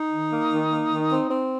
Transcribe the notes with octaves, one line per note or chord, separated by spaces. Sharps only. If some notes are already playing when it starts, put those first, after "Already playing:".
Already playing: D#4
D#3
A#3
D#3
A#3
D#3
C4
C4